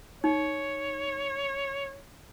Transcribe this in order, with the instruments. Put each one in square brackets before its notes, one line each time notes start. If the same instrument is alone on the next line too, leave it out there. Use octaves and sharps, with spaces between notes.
[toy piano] D#4 [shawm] C#5